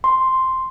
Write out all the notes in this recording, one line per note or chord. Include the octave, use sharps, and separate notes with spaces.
C6